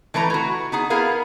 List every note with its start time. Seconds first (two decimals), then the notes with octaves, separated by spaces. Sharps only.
0.14 E3 A3 B4 A#5
0.30 E4 F#4
0.72 B3 D#4 G#4
0.90 B3 E4 G#4 A#4 F5